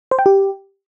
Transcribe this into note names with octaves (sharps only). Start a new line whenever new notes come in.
C5
G5
G4